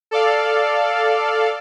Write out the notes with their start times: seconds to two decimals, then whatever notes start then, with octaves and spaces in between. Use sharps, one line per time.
0.11 A4 D5 F5